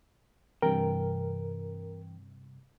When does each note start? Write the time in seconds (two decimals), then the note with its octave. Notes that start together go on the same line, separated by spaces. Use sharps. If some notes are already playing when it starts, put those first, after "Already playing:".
0.62 G2 C3 E3 A#4 G5